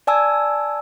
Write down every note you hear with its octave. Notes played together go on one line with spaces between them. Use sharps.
D5 G#5 A5 E6